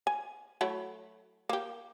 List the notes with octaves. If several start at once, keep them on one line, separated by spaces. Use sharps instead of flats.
G#5
F#3 A3 E4
A#3 G4